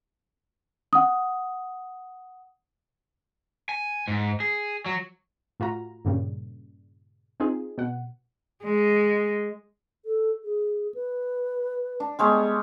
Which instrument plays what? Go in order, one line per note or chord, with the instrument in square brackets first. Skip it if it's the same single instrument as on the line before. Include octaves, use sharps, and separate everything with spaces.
[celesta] F#5 D#6
[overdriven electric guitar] G#5
G#2
G#4
F#3
[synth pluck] A2 F4 F#4 A#5
G2 A#2 C#3 G3
C4 D#4 F4 G#4
B2 F#5
[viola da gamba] G#3
[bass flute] A4
G#4
B4
[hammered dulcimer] D4
[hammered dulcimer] G3 G#3 C#5 [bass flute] B3